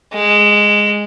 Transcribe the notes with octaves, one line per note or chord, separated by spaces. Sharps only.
G#3